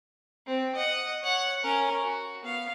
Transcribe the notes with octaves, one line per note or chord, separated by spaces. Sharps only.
C4
D#5 F#5
C#5 F#5
C#4 A#4
F#4
B3 F5